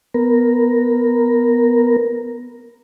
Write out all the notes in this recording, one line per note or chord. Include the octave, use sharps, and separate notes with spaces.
B3 A#4